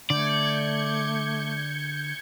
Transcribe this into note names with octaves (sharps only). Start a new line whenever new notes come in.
D3 A3 D5 G6 G#6 C#7